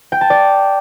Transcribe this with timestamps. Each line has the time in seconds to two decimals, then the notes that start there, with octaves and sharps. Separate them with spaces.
0.12 G5
0.21 A5
0.30 D5